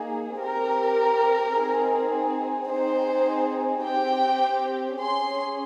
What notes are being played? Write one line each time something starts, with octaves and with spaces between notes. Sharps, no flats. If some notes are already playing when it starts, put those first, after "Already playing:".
Already playing: A#3 D#4 G#4
C4 G4 A#4
C4 D#4 G#4
C4 D#4 G#4 C5
C4 G4 G5
C#4 G#4 C6